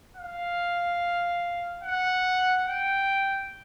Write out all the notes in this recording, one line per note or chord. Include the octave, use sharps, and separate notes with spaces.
F5
F#5
G5